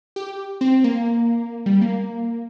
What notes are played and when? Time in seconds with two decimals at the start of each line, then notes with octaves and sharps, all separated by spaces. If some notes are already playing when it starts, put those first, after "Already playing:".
0.16 G4
0.61 C4
0.84 A#3
1.66 G3
1.82 A#3